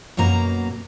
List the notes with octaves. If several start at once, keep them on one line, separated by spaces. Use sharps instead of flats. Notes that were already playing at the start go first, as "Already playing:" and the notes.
F#2 B2 A#3 A#5